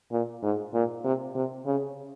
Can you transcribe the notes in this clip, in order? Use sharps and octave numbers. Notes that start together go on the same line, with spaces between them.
A#2
G#2
A#2
C3
C3
C#3